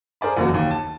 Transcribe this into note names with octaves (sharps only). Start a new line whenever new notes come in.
G#4 A#4 C5 D5 B5
F#1 E2 A#3 F#4
D#2
A5